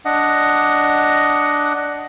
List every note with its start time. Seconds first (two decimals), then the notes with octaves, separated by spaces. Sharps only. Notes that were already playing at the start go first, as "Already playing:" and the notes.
0.05 D4 D#5 F#5